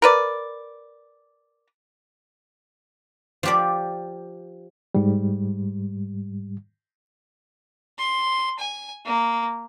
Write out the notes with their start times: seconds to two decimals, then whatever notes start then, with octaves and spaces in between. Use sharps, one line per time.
0.02 A#4 B4 D5
3.43 F3 G4 D5
4.95 G#2 G3
7.99 C6
8.59 G#5
9.06 A#3